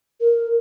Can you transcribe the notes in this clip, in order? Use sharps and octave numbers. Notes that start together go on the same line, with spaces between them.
A#4